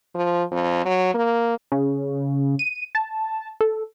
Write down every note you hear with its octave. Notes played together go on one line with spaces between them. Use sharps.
F3
F2
F#3
A#3
C#3
D#7
A5
A4